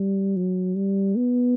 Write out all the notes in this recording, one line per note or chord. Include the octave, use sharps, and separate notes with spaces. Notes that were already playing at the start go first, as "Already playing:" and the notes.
Already playing: G3
F#3
G3
B3